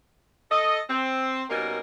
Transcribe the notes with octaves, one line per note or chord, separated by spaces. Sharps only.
A4 D#5
C4
B2 G3 A#3 C#4 D#4 A#4